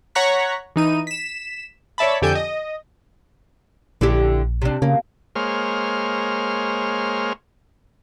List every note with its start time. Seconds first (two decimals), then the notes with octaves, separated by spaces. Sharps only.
0.15 C#5 F#5 A#5 C#6 F#6 B6
0.76 E3 D#4 D#7
1.07 B6 E7
1.98 C#5 D5 E5 A5 B5
2.22 F2 D3 G4 A4 G#5 G6
2.35 D#5
4.01 A#1 D3 E4 G4
4.62 C3 D4
4.82 C#3 A#3
5.36 G#3 A#3 C5 C#5 F6